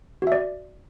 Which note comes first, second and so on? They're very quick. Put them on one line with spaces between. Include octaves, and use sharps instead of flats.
F#4 E5 D5